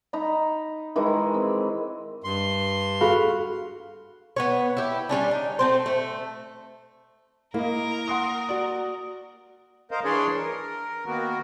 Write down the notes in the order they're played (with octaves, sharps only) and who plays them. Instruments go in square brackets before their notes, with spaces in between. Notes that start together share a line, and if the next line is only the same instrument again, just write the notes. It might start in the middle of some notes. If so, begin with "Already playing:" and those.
[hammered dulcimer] D#4 D#5 A#5 B5
D#3 E3 G#3
C4
[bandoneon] G2 C6
[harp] F#4 [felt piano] G#4 A4 B5 [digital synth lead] F5
[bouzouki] B3 B4 C#5
E4 G4
G3 G#3 C#4 D4
D#4
A3 C4 C5
A3
[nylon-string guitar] A#3 [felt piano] E4 D#5 [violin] A#4
[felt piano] F#5 C6 D#6
F#4 D5
[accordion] A#4 C5 D#5 F5
E3 D4 G#4 C#5 D5 C6
A#4
D#3 A#3 B3 F#4 A#4